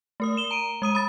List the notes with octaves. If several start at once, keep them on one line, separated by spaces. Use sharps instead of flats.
A3 A#4 D#6
E7 G7
A#5 D7 D#7
G#3 D#6 D#7
B5 D#6 A6